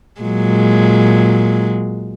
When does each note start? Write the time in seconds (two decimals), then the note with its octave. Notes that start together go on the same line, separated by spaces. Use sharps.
0.21 A#2 F#3 G#3